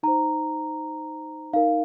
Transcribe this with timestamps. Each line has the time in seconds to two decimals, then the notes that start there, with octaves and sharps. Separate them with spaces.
0.03 D#4 C5 A#5
1.53 D#4 A#4 F5